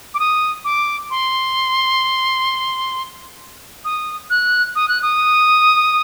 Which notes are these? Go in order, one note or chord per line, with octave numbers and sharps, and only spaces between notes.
D6
D#6
D6
C6
D#6
F#6
D#6
F#6
D#6